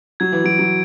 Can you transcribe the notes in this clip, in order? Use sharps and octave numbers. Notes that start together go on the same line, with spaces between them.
F#3 G#6
E3
F#3 D7
F#3